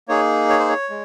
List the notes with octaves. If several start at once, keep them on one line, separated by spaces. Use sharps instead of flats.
A#3 D#4 G#4 C#5
C#5
C5
C#5
G#3